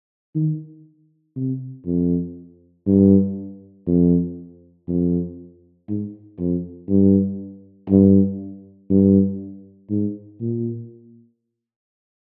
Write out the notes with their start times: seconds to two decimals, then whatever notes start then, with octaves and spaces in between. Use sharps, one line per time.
0.35 D#3
1.36 C3
1.86 F2
2.87 G2
3.87 F2
4.88 F2
5.89 G#2
6.39 F2
6.89 G2
7.90 G2
8.90 G2
9.90 G#2
10.41 A#2